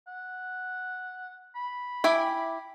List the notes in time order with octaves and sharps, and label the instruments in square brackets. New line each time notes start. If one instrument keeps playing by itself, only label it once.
[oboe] F#5
B5
[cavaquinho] E4 G5 D6 [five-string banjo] E5 G#5